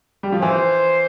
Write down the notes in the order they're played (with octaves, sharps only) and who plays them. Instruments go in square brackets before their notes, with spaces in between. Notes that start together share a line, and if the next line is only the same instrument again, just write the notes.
[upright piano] G3
F3
[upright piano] E3 [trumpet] C5